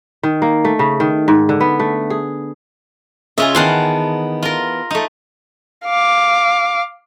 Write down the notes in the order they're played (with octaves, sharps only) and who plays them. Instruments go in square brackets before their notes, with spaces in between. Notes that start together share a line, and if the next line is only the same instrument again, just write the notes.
[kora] D#3
A#3
A3
C#3
D#3
G#2
D3
B3
A3
G#4
[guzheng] C#3 F4 G#4 [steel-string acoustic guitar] D#5 E5
[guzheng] D#3 F#5 C6 [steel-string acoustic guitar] E3 B3 A5
[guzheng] F4 A#4
A3 D#4
[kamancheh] F5 D6